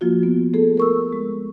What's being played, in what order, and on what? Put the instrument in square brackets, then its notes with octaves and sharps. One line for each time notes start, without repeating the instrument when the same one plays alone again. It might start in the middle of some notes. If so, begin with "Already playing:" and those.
[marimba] F3 A#3 F4 F#4
B3
A3 B3 G#4 A4
A#4 C#6 E6
G#3